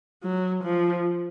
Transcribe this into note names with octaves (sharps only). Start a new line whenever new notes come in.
F#3
F3